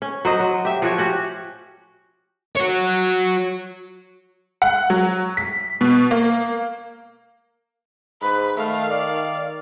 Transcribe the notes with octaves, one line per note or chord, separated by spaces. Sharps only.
C#4
F#3 C5 D#5
F#3
G4 E5
F3 F#4 C#5
C#4 F#4 G4
F#4 C#5
F#5
F#3
B6
B2
A#3
G#2 B4
D#3 A3 F5
D5